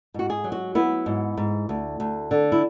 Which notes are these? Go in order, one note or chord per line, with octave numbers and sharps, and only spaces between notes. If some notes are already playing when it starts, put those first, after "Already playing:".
G#2 F#4
G#4
F#3
F#4
B3 E4
G#2
G#2
D2
D2
D3
E4